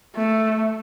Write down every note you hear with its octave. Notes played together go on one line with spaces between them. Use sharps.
A3